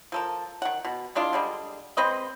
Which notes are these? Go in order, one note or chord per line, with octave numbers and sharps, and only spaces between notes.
F3 A4 A#4
D#3 F#5
B2
E3 G#3 D4 F4
D3 G3 G#3
G#3 C4 B4 D#5